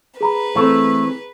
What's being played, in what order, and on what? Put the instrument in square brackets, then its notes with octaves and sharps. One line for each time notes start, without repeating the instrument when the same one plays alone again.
[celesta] G#4 A#5 B5 [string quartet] B4
[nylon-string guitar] E3 C4 A4 [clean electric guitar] A3